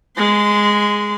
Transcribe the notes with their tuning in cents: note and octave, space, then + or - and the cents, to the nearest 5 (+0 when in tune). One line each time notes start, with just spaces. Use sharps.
G#3 +0 C6 -30